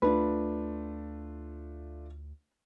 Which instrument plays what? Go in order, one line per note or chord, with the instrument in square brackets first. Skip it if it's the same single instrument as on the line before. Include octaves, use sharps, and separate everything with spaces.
[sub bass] D2 [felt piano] A3 D4 F4 [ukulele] B4